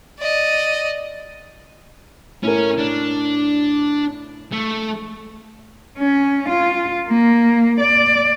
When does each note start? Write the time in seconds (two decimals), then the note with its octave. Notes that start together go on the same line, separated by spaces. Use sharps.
0.19 D5 D#5
2.44 A2 C#4 A#4
2.79 D4
4.52 A3
5.98 C#4
6.49 F4
7.07 A#3
7.81 D5